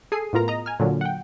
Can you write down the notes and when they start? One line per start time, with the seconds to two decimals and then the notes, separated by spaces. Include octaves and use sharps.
0.12 G#4 A4 C7 D#7
0.33 A2 B3 F4 A#4 A#5
0.48 D#5 A#5
0.66 G#5 F6
0.80 A#2 D3 F#3
1.01 F#5 G5